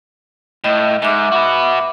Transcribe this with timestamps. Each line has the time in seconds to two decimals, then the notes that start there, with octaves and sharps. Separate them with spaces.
0.64 A2 D#5
1.02 G#2 E5 D6
1.32 F#4 B4